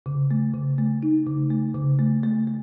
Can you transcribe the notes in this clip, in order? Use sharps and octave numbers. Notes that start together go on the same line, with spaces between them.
C#3
A3
C#3
A3
D#4
C#3
A3
C#3
A3
A3
A3